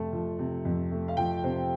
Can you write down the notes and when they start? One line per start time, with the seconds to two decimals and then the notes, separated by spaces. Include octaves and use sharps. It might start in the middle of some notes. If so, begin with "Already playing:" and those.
Already playing: F2 C3 A3 A5
0.13 F3
0.39 C3
0.65 F2
0.91 A3
1.08 F5
1.17 F3 G5
1.44 C3 C5